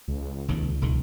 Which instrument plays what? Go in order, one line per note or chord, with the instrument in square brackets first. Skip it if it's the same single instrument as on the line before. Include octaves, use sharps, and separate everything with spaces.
[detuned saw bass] C#2
[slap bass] F1 D#2 D#3
E1 B1 D#3